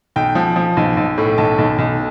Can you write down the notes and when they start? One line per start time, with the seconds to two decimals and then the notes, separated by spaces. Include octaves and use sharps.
0.16 B1 G5
0.35 F3
0.56 F3
0.77 B1
0.97 B1
1.18 A2
1.38 B1 A5
1.58 B1
1.78 B1